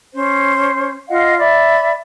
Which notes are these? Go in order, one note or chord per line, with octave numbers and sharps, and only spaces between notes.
C#4 C5
F4 D#5 F5 F#5
D5 E5 B5